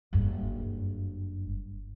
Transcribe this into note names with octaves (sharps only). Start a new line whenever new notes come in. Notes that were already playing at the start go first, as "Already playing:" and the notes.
F#1 G2